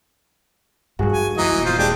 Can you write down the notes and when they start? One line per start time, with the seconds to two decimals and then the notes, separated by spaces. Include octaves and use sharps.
0.99 G2 G3 F#4 G#4
1.12 G#5
1.37 F#1 E3 D#4 F#4 D#5 A#5
1.52 D#1 E2
1.65 F4 C5
1.79 G#3 D4 G4 G5